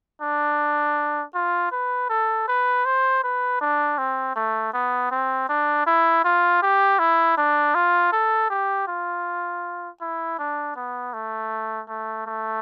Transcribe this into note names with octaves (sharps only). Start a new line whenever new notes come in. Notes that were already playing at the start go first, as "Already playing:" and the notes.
D4
F4
B4
A4
B4
C5
B4
D4
C4
A3
B3
C4
D4
E4
F4
G4
E4
D4
F4
A4
G4
F4
E4
D4
B3
A3
A3
A3